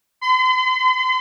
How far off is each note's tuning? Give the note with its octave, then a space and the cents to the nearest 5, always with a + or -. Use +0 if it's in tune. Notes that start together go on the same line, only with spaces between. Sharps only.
C6 -45